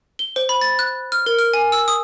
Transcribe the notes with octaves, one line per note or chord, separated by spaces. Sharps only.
G7
C5
B5
A6
F#6
F6
A#4
F6
G#5
E6
D#6